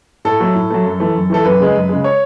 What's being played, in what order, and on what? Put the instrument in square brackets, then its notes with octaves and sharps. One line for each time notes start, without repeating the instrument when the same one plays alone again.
[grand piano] A2 A4
F#3 A3
A2
F#3 A3
F#2
E3 A3
F#2
E3 A3 A4
F#2 B4
C#3 G#3
F#2
C#3 G#3
C#5